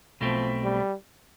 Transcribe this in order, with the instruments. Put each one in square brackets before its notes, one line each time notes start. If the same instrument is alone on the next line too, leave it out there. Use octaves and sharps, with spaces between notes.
[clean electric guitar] B1 B2 A3 C4 [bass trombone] F3
[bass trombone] G3